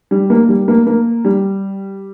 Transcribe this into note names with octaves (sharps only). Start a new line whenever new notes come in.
G3
A#3
G3
A#3
A#3
G3